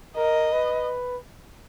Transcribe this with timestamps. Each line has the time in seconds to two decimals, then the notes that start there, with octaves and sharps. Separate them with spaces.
0.17 A#4 D#5
0.52 B4